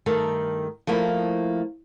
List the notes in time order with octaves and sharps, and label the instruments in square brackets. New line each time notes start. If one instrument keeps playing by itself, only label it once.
[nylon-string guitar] G2 D#3 A3 A4 A#4
F3 A3 A#3 E4